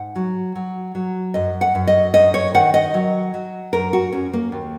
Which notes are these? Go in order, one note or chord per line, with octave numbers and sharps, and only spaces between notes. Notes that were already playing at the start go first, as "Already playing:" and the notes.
Already playing: G#2 F#5
F#3
F#3
F#3
F#2 D#5
F#5
F#2
D#5
F#2 D#5
C#5
D#3 F#5
D#5
F#3
F#3
F#2 A#4
F#4
F#2 C#4
A#3
D#2